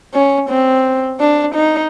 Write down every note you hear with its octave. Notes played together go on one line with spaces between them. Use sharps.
C#4
C4
D4
D#4